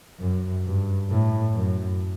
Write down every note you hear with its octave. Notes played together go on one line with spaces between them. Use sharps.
F#2
G2
A2
F#2